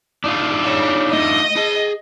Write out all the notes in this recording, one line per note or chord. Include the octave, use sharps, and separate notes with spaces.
D4 D#4 F4
C#5 F5
A3 D#5
G#4 A5